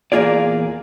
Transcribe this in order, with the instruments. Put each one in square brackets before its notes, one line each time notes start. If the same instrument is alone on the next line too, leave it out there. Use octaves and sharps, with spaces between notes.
[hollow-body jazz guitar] E2 A#2 A#3 F4 G#4 D5